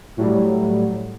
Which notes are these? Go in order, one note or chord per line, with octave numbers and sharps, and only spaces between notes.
A2 F#3 G3